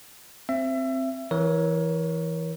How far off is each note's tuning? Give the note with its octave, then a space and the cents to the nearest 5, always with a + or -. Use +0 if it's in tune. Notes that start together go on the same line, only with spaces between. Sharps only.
C4 +0 E5 +25
E3 +0 A#4 +25 C#5 +0